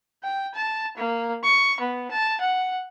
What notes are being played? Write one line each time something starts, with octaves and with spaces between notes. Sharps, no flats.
G5
A5
A#3
C#6
B3
A5
F#5